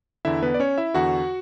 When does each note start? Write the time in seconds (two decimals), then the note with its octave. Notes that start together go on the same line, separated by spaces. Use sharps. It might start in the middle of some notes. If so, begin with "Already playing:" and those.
0.25 E2 D3 E4 E5
0.42 B3 B4
0.54 D5
0.60 C#4 C#5
0.78 E4 E5
0.94 E2 D3 F#4 F#5